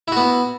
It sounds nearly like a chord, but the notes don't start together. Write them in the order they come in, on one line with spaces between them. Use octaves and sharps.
E4 F#4 B3